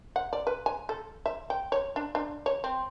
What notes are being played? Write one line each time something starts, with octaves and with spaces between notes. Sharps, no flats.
F#5
D5
B4
G#5
A4
E5
G5
C#5
D4
D4
C#5
C4